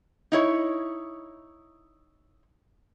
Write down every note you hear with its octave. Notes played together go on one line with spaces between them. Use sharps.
D#4 E4 C#5